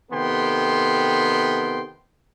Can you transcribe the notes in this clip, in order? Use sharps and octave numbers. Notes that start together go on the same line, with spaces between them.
C3 D#3 B3 A4 G5 C6